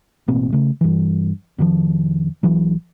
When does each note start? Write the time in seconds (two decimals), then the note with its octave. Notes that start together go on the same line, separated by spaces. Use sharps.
0.28 A1 B2 A#3 C4
0.52 C#3 A3
0.81 G2 E3
1.58 F1 D#3 F3
2.43 A#1 E3 F#3